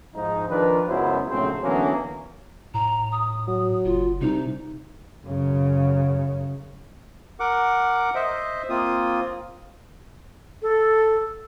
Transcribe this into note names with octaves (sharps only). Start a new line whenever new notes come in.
G#2 F3 D#4
D#3 F3 D4 A#4 B4
C#2 F#2 F#3 B3 E4 C5
A#1 A2 C#3 F#3 C4 C5
D3 E3 F#3 A#3 B3 C#4
A2 A#5
D#6
F#3
F#1 F4
C2 C3 D#4
F#2 C#3
A#4 F#5 D6
C5 D#5 E5
A#3 C4 F4 D#6
A4